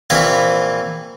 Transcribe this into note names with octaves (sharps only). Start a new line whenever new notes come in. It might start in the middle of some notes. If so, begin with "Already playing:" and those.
A#1 E3 C4 E4 B4 F5